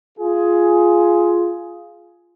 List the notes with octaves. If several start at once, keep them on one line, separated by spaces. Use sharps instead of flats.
F4 G#4